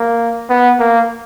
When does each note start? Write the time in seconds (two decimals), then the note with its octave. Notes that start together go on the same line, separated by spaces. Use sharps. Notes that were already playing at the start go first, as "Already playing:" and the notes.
Already playing: A#3
0.49 B3
0.79 A#3